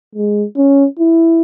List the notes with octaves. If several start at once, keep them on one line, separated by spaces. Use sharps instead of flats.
G#3
C#4
E4